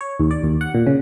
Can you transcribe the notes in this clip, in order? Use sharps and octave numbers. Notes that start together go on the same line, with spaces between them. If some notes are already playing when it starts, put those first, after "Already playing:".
C#5
D#2
D5
D#2
F#5
A#2
C#3